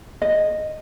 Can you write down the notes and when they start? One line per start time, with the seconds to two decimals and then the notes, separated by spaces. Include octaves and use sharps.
0.22 D#5